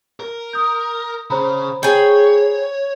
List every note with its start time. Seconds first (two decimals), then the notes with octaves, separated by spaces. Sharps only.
0.20 A#4
0.53 D#6 G6
1.30 C#3 C5 A#5 B5
1.83 G#4 C#5 G5